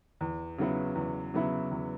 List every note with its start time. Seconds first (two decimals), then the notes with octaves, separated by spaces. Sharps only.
0.21 E2
0.58 C#3 F#3 B3 E4
0.95 E2
1.34 C#3 F#3 B3 E4
1.71 E2